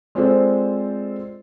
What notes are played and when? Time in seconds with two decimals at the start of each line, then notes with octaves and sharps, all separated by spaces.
0.15 G#3 C4 F4 A4 C5 D5